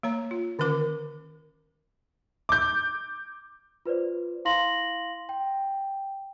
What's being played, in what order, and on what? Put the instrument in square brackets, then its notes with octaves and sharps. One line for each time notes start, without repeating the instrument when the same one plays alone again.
[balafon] A#3 C#5 A#5
F4
D3 D#3 C#4 A#4 D6
[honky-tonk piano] D6 G6
[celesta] F4 B4 C5 D5
E4 F5 C6 A#6 F#7
G5